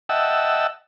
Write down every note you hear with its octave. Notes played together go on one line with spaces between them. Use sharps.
D#5 E5 F#5 G5 A5 E6